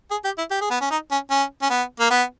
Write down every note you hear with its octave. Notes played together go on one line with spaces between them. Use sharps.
G#4
G4
E4
G4
G#4
B3
C#4
D#4
C#4
C#4
C#4
B3
A#3
B3